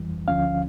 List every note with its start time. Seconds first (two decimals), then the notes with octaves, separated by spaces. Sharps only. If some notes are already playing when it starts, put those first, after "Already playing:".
Already playing: F2 E3 G3
0.28 D2 D3 F3 C#4 F5